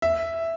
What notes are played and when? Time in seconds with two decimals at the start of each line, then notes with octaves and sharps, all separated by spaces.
0.02 E5